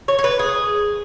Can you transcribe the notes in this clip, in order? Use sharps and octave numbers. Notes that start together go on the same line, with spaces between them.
C#5
C#5
B4
G#4